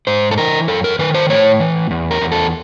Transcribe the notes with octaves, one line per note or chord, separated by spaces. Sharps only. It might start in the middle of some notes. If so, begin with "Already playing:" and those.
G#2 C5
A4
E3 A#4
F#2 A4
A#4
D#3 B4
C5
A2 C#5
E3
E2
A#4
E2
A4